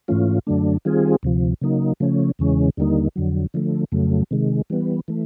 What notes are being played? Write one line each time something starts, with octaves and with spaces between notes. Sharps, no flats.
G#2 E3 A3 C#4 F4
F#2 D3 F#3 A3 D4
D#3 G3 C4 F4 G#4
D2 C3 F3
C#3 F#3 A#3 D#4
C#3 F3 A3 C#4
E2 C#3 E3 G#3 C#4
D#2 D3 G3 A#3 D#4
F2 D3 F#3
D3 F3 A3
F2 C#3 F#3 A3
C3 D#3 G#3
E3 G3 B3
E3 A3